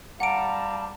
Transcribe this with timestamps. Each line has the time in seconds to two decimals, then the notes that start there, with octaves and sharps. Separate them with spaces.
0.20 G3 F5 F#5 A5 A#5 C#7 D7